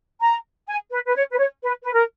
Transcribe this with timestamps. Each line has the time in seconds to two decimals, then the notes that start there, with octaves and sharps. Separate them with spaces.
0.21 A#5
0.68 G#5
0.91 B4
1.06 B4
1.15 C#5
1.32 B4
1.38 C#5
1.62 B4
1.83 B4
1.93 A#4